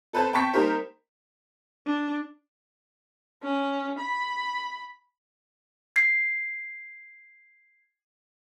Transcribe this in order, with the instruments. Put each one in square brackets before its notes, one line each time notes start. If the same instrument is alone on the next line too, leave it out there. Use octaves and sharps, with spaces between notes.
[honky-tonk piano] A4 B4 C5 A5
G5 A5 C#6 B6
G3 A#3 D#4 G4 A#4 C5
[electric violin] D4
[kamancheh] C#4
B5
[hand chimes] G#6 C7